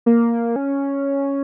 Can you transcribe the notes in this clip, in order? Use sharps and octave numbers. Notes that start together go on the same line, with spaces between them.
A#3
C#4